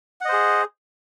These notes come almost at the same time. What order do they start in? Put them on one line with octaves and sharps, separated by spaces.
F#5 D#5 C5 G#4